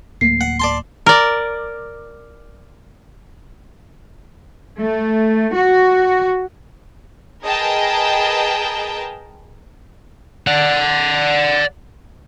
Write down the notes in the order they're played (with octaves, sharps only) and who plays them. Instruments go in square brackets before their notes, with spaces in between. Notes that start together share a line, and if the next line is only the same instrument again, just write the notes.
[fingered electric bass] D1 A3 A#3 [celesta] C7
[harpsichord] F#5
D5 A5 C6
[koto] A#4 D5
[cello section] A3
F#4
[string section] G#4 A#4 B4 D#5 G5 A5
[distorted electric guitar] D5 F#5